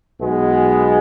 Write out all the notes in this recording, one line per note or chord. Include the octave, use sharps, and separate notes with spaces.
B1 B2 G#3 B3